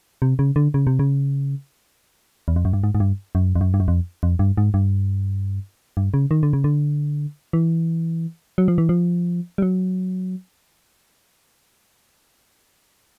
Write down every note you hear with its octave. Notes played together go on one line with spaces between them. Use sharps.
C3
C#3
D3
C#3
C3
C#3
E2
F2
F#2
G2
G#2
G#2
G2
F#2
F2
F#2
G2
F#2
F2
F2
G2
G#2
G2
G2
C#3
D#3
D3
C#3
D3
E3
F#3
F3
E3
F3
G3
F#3